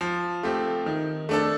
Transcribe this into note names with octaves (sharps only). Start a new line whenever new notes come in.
F3
A3 C4 G4
D#3
A3 D4 A4